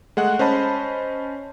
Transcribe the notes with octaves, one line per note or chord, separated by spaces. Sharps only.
G#3 A3 F#5 F#6
C#4 C5 D#5 A5 B5